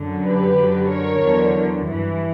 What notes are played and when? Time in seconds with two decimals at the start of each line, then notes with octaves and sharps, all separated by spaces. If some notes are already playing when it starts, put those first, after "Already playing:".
Already playing: F#2 D3 F#3
0.25 G4 B4
0.58 F#2 D3 F#3
0.90 A#4 C#5
1.22 E2 D3 F#3
1.87 G2 E3